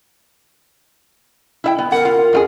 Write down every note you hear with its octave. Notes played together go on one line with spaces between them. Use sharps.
E4 E5 G5
B3
A#4 F#5
F4
F2 F4 G#4